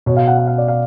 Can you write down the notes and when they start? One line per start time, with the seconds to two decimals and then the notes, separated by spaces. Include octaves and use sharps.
0.06 B2 C#5
0.17 F5
0.28 F#5
0.38 F#5
0.47 F5
0.58 D5
0.68 F5